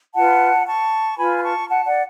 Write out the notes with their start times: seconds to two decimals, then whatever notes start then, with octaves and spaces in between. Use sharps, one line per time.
0.14 F4 B4 F#5 A5
0.66 A5 C#6
1.16 F4 B4 G#5 B5
1.38 B5
1.43 A5 C#6
1.69 F#5 A5
1.85 D5 F#5